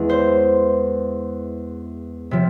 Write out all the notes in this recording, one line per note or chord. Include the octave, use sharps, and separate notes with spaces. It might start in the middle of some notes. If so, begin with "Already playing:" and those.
Already playing: E2 E3 G#3
C5
C3 F3